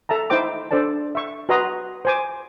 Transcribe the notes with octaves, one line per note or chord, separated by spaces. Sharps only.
A4 E5 A5 A#5
D#4 E4 C5 G5 D6
D4 A4 C5 D5 A5
E5 C#6
F#4 B4 D#5 A#5 C6 D#6
C5 G#5 D6